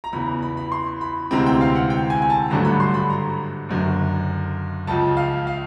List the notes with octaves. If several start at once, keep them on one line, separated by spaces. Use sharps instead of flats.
A#5
E2 C#3 E3 B5
B5
B5
C6
B5
D2 C3 E3 G#3 C4 A#5
G5
F5
F#5
G5
G#5
G#5
A5
G#1 G2 D3 F#3 A3 A#5
B5
C6
B5
A#5
F#1 F#2 D3
C#2 C#3 F3 A5
F5
F5